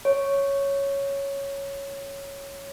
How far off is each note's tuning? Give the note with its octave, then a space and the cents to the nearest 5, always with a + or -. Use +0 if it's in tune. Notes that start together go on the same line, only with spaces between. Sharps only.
C#5 +0